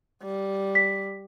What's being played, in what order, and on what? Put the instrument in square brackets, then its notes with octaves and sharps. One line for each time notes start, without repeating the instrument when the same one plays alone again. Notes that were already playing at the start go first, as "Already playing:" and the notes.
[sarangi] G3
[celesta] B6